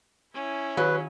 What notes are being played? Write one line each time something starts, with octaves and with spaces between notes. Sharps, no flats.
C#4 E4
D#3 F#3 B4